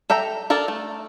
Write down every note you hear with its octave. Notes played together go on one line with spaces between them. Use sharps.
A4 E5 G5 A#5
D4 A4 A#4
A3